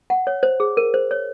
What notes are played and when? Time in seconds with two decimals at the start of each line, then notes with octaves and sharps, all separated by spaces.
0.10 F#5
0.27 C#5
0.43 C5
0.60 G#4
0.77 A#4
0.94 C5
1.11 C#5